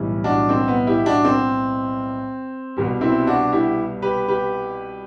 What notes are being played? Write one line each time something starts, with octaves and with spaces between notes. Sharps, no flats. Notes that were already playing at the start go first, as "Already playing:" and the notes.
Already playing: B1 A2 E3 G3
D4 F#4
C4
B3
E4 G4
D4 F#4
C4
C2 B2 G3
C4 E4
D4 F#4
E4 G4
G4 B4
G4 B4